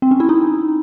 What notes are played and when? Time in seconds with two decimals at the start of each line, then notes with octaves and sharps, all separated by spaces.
0.02 C4
0.11 C#4
0.20 E4
0.29 D#4